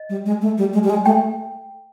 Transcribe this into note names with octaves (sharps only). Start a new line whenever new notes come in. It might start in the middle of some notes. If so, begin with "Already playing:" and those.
Already playing: D#5
G3
G#3
A3
G3
G#3
G3
G#3
A3 G5